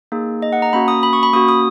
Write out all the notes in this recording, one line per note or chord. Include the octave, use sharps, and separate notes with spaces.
A#3 D#4 G#4
D#5
F#5
A#5
A#3 C#4 F#4 B5
D#6
B5
C#6
B5
A#3 C#4 F#4 D#6
D#6